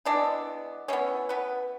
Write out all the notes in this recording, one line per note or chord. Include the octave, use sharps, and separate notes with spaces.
E3 G#3 B3 D4 D5
E3 G#3 B3 C#4 C#5
B3 B4